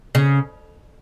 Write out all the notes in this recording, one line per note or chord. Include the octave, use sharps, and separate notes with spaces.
C#3